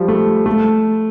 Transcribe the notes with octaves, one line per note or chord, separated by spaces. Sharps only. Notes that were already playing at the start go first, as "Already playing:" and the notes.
Already playing: F3 G3
A3
A3